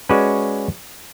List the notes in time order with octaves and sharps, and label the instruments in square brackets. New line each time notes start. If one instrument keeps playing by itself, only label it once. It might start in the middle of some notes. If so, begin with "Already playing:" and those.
[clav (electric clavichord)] G#3 C#4 F#4 B4 D5